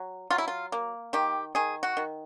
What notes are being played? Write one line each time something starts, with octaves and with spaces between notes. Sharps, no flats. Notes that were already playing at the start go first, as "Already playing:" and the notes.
Already playing: F#3
F#3 F4
E4
F4
A#3
D#3 G4
D#3 G#4
F#4
D#3